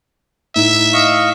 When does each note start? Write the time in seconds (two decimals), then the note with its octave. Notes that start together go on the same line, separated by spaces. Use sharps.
0.56 A2 D#4 E5
0.93 D#5 F5 C#6